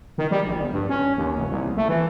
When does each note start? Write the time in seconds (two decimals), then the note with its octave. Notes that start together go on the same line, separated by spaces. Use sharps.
0.18 D#3
0.31 G3
0.46 A#1
0.59 G1
0.73 G2
0.89 C#4
1.17 D#2
1.37 F1
1.51 C2
1.77 A3
1.88 E3